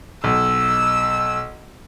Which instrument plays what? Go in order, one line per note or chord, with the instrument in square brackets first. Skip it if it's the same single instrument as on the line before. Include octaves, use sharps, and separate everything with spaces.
[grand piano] B1 [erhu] E6